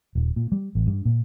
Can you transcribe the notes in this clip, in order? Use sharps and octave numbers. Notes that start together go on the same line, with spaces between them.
D#1
A#2
G3
A1
G2
A#2